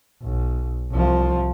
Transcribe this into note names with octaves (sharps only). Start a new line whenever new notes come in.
B1
C2 F3